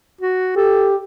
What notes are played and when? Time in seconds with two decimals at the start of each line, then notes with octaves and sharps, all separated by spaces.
0.21 F#4
0.56 G4 A4